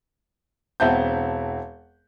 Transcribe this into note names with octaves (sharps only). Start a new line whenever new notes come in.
E1 C4 E5 F#5 A5 G6